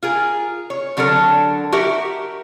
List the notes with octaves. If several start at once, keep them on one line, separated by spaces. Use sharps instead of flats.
F4 G#4 A#4
C#5
D3 F#3 D4 A4 A#4
F#4 G4 A#4 E5